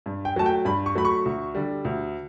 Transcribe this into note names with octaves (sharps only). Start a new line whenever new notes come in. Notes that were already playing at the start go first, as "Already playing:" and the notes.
G2
G5
F#3 A3 A5
G5
G2 B5
C#6
F#3 A3 B5
C#6
D2
D3 G3
D2